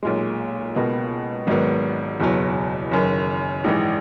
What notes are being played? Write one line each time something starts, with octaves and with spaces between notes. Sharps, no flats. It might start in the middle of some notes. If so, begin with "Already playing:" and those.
B1 A#2 G#3
C#2 B2 A#3
G#1 G#2 D#3 F#3 B3
F#1 E2 B2 F#3
F#1 F#2 D#3
A#1 G#2 E3